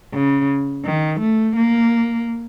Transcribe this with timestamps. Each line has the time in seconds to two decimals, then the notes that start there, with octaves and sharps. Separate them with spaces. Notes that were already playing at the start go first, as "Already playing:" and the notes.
0.14 C#3
0.85 D#3
1.20 A3
1.56 A#3